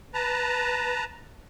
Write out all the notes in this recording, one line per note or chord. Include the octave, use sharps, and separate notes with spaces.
B4 A5 A#5